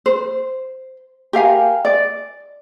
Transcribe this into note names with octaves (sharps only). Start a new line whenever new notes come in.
C5
G4 A#4 F5 G#5
D5